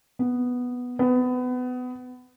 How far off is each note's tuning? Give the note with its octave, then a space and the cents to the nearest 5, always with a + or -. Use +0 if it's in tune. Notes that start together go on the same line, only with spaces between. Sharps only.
B3 +0
B3 +25